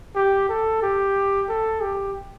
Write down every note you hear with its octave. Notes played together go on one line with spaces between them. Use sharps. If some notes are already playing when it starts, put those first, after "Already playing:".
G4
A4
G4
A4
G4